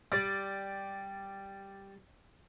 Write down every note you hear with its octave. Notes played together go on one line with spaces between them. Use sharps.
G3 D5